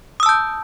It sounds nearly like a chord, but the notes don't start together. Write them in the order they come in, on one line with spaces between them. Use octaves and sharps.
D#6 E6 A5 G6